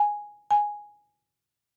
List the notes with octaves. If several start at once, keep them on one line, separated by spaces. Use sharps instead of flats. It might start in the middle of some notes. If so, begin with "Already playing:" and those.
Already playing: G#5
G#5